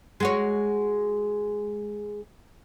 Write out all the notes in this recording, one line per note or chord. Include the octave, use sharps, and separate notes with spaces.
G#3 F#4 C#5